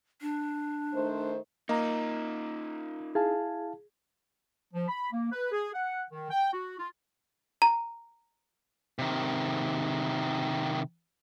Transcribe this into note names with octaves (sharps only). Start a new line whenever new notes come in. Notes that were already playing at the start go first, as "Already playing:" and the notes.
D4
D#3 A3 C5
A#3 D#4 F4 D#5 A#5
E4 G#4 F5 A5
F3
B5
A#3
B4
G#4
F#5
D#3
G5
F#4
F4
A#5
C3 D#3